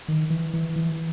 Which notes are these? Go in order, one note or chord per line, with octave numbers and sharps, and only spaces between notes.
D#3
E3
E3
E3